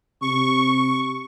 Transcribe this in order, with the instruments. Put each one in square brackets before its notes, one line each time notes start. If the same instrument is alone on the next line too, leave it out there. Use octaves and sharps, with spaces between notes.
[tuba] C3 [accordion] C#6